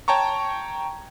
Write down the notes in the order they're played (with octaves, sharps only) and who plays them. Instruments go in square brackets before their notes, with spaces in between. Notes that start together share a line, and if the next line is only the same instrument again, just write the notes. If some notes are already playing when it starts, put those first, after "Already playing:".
[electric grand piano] C#5 G5 A5 A#5 C#6